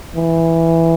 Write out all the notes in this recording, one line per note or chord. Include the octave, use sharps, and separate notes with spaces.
E3